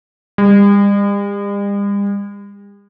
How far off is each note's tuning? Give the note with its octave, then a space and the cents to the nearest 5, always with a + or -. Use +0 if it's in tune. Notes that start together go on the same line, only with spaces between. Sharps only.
G3 +45